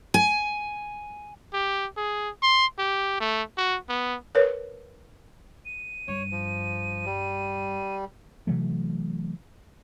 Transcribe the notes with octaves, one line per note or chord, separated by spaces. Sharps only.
G#5
G4
G#4
C6
G4
A3
F#4
B3
A#4 B4 C#5
D#7
G2 C#5
F3
G3
C3 E3 F#3 A3